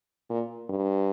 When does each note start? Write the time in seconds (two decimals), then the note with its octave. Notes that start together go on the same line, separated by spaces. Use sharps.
0.30 A#2
0.70 G2